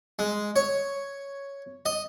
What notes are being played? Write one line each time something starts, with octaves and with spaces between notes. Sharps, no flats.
G#3
C#5
D#5